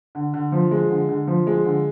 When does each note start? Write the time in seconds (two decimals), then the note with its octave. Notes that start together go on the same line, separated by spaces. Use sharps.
0.15 D3
0.34 D3
0.52 F3
0.71 G#3
0.90 D3
1.09 D3
1.27 F3
1.47 G#3
1.65 D3